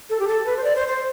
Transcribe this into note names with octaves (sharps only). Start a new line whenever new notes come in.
A4
G4
A4
B4
C5
D5
C5
C5